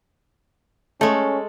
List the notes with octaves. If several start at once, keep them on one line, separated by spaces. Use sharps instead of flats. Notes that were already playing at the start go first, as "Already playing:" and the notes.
G#3 A3 C#4 A4